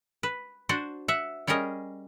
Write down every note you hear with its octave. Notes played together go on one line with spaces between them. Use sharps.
B4
D4 F#4 C5
E5 F#5
G3 C#4 G#4 A#4 D#5